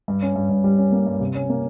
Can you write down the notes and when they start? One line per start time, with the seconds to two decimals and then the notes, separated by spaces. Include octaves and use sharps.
0.08 G2
0.22 C#4
0.36 G2
0.49 G2
0.64 G3
0.78 C#4
0.92 A#3
1.07 G2
1.20 C3
1.35 C#4
1.50 A#3